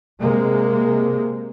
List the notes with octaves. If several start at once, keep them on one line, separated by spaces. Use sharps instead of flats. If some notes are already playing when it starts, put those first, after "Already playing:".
C3 G#3 A#3